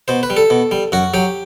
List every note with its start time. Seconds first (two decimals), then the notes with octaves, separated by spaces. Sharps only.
0.08 B2 C5
0.23 B4
0.30 G3
0.37 A4
0.50 B2
0.71 G3
0.92 F#2 F#4
1.14 F#3 G4